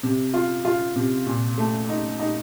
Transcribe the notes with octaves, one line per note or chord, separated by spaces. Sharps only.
C3
F4
F4
C3
A#2
A3
D#4
D#4